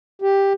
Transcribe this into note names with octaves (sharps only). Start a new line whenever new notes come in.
G4